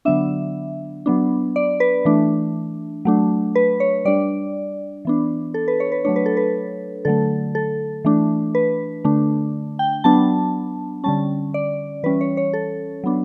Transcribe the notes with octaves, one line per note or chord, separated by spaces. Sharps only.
D3 F#3 B3 D4 E5
F#3 B3 D4
D5
B4
E3 A3 D4
F#3 A3 D4
B4
C#5
G3 D4 D5
E3 B3 D4
A4
B4
C#5
B4
F#3 A3 D4 C#5
B4
A4
B4
D3 F#3 A3 A4
A4
E3 A3 D4
B4
D3 A3 D4
G5
F#3 B3 D4 A5
D3 G3 C#4 A5
D5
E3 G3 C#4 B4
C#5
C#5
A4
F#3 B3 D4